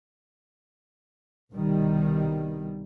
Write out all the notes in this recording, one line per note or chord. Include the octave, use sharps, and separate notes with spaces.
C2 B2 D#3 G3